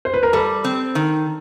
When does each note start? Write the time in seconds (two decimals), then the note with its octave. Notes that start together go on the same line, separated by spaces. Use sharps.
0.05 C5
0.14 B4
0.23 A#4
0.33 G3 A4
0.64 C4
0.95 D#3